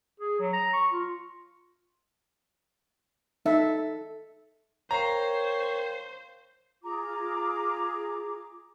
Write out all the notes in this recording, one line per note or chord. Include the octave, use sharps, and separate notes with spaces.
G#4
F#3
A#5
C#6
F4
D#4 A4 E5
A#4 C5 C#5 F5 G5 A#5 C7
F4 G#4 A#5 D6